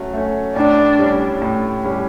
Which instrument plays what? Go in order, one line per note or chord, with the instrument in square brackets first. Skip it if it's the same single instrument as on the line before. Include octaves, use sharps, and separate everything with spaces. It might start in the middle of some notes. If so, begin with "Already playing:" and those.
Already playing: [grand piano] F#3 A3 C#4
A3 C#4
[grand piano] A2 [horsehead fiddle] D4
[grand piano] G3 C#4
A2
G3 C#4